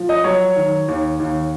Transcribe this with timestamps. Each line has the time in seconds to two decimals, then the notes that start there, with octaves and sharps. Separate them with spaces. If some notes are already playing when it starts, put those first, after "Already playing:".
Already playing: F3
0.09 D#5
0.24 F#3 C#5
0.56 D#3
0.88 D#2
1.19 D#2